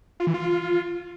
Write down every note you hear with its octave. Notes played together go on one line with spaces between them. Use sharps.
F4
E3
F4